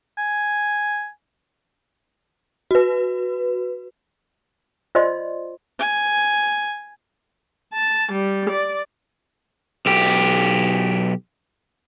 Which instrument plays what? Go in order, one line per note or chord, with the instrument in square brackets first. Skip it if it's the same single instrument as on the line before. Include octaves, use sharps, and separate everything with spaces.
[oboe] G#5
[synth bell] F#4 B4
[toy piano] F4 C5 D5 D#5 C6
[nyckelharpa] G#5
[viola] A5
G3
D5
[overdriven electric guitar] B1 G4